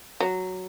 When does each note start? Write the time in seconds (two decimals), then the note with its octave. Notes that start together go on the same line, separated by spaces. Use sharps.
0.20 F#3